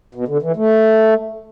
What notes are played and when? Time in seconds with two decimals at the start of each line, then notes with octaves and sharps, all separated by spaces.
0.15 B2
0.28 D3
0.42 E3
0.56 A3